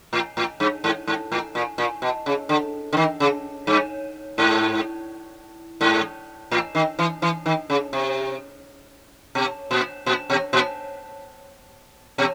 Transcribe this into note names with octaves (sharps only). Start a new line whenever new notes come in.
A2
A2
G2
G#2
G#2
A2
A#2
A#2
B2
C#3
D3
D3
D#3
C#3
G2
G#2
G#2
A2
D#3
E3
E3
D#3
C#3
C3
B2
A#2
A#2
B2
A#2
B2